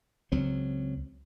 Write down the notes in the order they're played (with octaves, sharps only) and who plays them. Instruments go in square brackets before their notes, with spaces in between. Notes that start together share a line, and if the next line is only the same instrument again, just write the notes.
[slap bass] C#2 F#3 C4